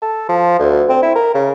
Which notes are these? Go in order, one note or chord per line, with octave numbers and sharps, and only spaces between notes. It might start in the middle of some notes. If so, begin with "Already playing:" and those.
A4
F3
D2
C4
E4
A#4
C#3